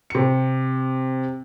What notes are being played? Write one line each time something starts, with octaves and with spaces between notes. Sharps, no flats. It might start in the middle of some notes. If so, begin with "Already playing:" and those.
C3 C#7